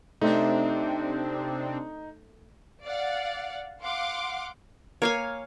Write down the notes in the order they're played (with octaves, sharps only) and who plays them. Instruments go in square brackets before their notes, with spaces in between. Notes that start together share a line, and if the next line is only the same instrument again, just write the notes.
[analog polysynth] C3 C4 D4 [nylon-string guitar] A3 [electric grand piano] D#4
[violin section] D5 F5 F#5
F5 F#5 C6 D6
[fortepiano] A#3 [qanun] C#5 F5 G#5